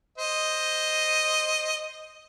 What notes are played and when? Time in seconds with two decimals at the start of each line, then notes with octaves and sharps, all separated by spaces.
0.18 C5 D#5